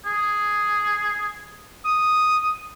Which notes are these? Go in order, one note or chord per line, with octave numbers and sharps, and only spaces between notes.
G#4
D#6